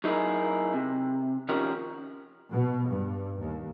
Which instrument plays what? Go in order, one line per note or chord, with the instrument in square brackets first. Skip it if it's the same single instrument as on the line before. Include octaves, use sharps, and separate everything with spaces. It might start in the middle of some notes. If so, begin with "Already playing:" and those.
[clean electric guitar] F#3 D#4 E4 G#4 A#4
C3
D#3 F3 C#4 F#4 G4 A#4
[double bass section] B2
G2
D#2